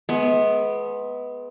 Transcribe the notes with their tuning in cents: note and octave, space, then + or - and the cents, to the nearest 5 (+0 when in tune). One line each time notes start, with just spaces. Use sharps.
G#3 +35 B3 +0